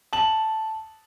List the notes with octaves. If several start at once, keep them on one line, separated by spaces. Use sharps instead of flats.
A5 F#7